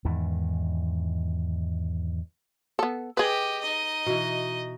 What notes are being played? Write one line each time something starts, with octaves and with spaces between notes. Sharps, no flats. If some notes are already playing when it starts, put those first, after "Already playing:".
E2 G#2 D#3
B3 A4
G4 G#4 B4 D#5
D#4 D#5
B2 E3